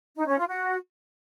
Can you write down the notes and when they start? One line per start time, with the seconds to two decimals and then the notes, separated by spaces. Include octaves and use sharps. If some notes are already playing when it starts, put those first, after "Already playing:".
0.17 D#4
0.27 C#4
0.38 F4
0.48 F#4